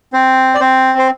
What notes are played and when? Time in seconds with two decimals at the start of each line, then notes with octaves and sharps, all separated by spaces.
0.13 C4 C5
0.55 D5
0.60 C4 C5
0.98 C5